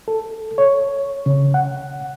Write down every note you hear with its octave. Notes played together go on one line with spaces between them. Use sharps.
A4
C#5
C#3
F#5